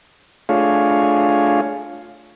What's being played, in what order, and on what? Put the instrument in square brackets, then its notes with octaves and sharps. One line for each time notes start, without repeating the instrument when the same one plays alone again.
[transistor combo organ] A3 D4 F4 G#4 C#5 F5